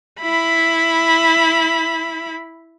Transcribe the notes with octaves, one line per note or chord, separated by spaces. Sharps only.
E4 B5